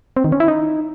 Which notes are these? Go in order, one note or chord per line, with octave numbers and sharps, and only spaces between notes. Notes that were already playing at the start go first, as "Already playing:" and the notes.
C4
D#3
C#4
E4
D#4